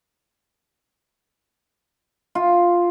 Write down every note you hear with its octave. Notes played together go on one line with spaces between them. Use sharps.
F4